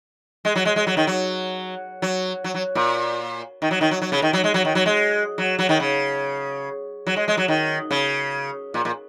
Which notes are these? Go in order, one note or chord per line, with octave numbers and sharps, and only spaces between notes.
G#3
F#3
G#3
G#3
F#3
D#3
F#3
F#3
F#3
F#3
A#2
D#3
F#3
D#3
F#3
F#3
C#3
D#3
F#3
G#3
F#3
D#3
F#3
G#3
F#3
F#3
D#3
C#3
F#3
G#3
G#3
F#3
D#3
C#3
A#2
A#2